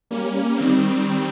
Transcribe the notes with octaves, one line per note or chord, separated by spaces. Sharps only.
G3 A#3 C#4
D#3 G3 C4